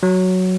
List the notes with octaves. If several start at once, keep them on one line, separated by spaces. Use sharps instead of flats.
F#3